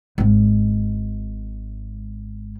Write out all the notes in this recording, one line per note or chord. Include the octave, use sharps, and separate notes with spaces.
G#1 G#3